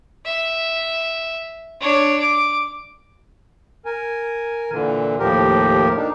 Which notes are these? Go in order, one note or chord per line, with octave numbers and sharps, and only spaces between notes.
E5
D4 C#5
D6
A#4 G#5
A#2 D3 E3
D#2 A2 F3 G4 A#4
D4 D#4